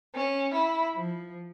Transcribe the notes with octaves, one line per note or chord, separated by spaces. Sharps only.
C#4
E4
F3